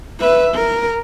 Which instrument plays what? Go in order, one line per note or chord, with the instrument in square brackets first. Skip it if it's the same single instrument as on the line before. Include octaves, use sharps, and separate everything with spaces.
[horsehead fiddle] B4 E5
A#4